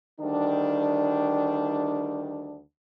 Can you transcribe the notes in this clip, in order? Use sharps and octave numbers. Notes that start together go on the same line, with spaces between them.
D2 D#3 G3 D4